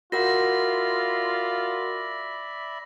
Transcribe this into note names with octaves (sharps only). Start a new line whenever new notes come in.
F4 F#4 A#4 D5 E5 F#5 B5 A#6